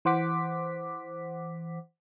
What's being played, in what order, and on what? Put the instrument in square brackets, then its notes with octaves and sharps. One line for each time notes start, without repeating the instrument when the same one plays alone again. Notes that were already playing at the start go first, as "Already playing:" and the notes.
[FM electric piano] E3 C5 F#5 D6 B6